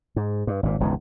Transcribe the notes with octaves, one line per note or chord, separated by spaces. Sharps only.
G#2
G2
G#1 A#2
E1 C#2 G#2 D#3